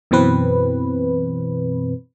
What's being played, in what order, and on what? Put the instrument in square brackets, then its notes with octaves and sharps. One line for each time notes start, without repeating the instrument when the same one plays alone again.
[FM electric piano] F#2 B2 E3 C4 B4